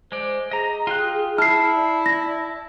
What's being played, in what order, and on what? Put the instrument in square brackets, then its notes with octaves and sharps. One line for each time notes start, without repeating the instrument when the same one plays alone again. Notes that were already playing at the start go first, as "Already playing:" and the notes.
[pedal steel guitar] G#3 D5 [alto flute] C5
[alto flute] G#4 [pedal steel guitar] D#5 A#5
[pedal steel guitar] F4 G4 F#6
[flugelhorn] E4 [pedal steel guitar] A5 [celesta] F6 C7
[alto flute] D5
[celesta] A#6